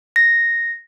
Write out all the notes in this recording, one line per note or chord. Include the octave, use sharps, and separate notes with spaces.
A#6